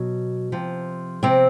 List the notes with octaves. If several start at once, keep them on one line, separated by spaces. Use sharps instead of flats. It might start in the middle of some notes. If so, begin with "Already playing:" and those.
Already playing: B2 F#3
C3 F3
C3 C4